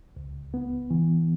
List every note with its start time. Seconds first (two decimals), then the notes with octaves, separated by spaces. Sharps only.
0.16 C#2
0.54 B3
0.91 E3